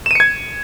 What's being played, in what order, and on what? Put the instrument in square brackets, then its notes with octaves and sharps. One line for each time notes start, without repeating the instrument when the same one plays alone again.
[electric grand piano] E7
D#7
C#7
G#6